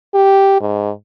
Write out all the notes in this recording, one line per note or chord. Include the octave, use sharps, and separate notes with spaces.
G4
G#2